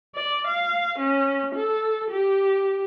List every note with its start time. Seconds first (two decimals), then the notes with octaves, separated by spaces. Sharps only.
0.16 D5
0.47 F5
0.99 C#4
1.55 A4
2.11 G4